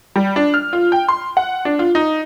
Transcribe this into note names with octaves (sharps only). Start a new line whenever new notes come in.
G3
D4
F6
F4
G5
C6
F#5
D4
F4
D#4